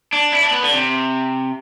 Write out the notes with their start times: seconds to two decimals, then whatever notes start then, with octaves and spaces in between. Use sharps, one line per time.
0.13 D4
0.32 E4
0.42 D4
0.52 B3
0.62 D3
0.72 C3